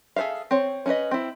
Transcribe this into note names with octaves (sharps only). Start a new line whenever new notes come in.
G#4 A4 C5 E5 F5
C4 C#5
C#4 D#4 E4 B4 D#5
C4 E4